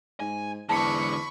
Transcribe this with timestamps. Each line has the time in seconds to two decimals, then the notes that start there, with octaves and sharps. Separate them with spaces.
0.20 G#2 G#5
0.69 E2 G#2 D3 A5 B5 C#6 C#7